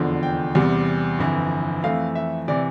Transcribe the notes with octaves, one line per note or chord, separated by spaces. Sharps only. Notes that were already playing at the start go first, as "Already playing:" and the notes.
Already playing: F1 E2 D3 F3
G5
E2 C3 G3
G1 F2 E3
F2 E3 A3 F5
E5
C3 E3 D5